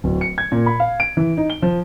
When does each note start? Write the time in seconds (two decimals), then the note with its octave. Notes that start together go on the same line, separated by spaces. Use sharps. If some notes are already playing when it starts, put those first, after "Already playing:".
0.04 D1
0.21 C#7
0.38 G#6
0.52 A#2
0.66 B5
0.80 F5
1.00 D7
1.17 E3
1.37 D#4
1.50 G7
1.62 F3